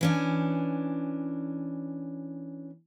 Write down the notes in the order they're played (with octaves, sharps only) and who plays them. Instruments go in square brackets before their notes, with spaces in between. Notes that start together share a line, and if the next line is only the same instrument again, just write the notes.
[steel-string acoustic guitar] E3 C#4 D4